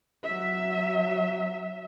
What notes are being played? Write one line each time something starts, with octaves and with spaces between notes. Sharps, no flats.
F#3 E5